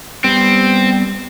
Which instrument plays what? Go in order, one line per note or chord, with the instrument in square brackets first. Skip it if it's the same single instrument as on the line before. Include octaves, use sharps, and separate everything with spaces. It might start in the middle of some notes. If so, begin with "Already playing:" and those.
[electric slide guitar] G3 B3 [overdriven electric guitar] C4